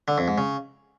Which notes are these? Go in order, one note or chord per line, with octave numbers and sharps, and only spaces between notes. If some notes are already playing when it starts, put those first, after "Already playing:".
D3
F2
G#2
C#3